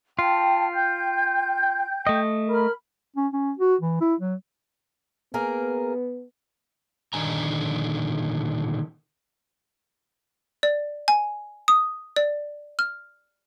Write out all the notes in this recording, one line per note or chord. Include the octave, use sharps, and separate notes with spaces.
F4 G5 A5
G5 G6
A3 D#5
A#4 B5 F6
C#4
C#4
F#4
E3
E4
F#3
A#3 B3 G#4 A#4
A#2 D3 D#3 D4 G#5 A#5
D5
G#5
D#6
D5
F6